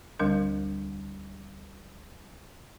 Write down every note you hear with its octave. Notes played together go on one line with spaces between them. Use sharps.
D2 D3 G3 D4 A#4